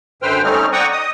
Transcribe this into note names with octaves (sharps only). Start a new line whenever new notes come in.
F#2 D3 B4 C5 G5 F6
G3 A3 C4 C#4 D#4 F6
D5 F#5 G5 A#5 C#6 D#6
D#5 D#6